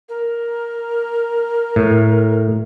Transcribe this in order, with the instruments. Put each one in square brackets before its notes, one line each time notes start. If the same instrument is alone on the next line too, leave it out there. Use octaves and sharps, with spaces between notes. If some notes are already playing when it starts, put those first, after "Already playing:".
[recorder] A#4
[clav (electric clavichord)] A2